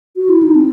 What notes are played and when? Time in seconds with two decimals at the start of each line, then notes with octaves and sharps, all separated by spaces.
0.16 F#4
0.29 E4
0.43 D#4
0.56 C4